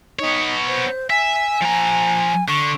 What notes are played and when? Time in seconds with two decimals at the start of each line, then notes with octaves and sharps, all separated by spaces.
0.19 B3 D#4 C#5
0.67 C5
1.10 E5 G#5
1.62 F3 A#5
2.48 D3 C#6